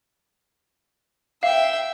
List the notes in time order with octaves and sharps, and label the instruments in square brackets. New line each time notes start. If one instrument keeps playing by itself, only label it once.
[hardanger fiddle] E5 G5 [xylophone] F5